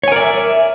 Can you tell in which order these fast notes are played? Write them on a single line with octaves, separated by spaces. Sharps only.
C#5 G#5 A#4 D5 E5